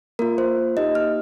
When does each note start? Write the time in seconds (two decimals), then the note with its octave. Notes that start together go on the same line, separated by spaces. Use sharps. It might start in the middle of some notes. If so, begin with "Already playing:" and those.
0.19 A#3 F4 A#4
0.38 C5
0.77 A#3 D#4 G4 D#5
0.95 F6